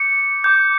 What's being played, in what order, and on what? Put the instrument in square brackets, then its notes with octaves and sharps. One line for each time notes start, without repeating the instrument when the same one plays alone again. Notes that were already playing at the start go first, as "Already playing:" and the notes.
Already playing: [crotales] D6 G6 C#7
D6 G6